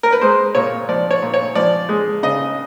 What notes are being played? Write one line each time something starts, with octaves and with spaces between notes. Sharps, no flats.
A#4
B4
G#3 C5
A#2 C#5
F3 D5
C#5
A#2
C#5
F3 D5
G#3
C#3 D#5